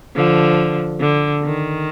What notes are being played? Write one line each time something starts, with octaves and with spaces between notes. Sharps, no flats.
D3 F3
D3
D#3